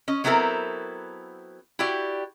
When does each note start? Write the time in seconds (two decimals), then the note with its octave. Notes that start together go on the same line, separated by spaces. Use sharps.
0.08 C#4 D#5
0.24 F#3 B3 C4 E4 A4 A#4
1.79 E4 F#4 G4 D5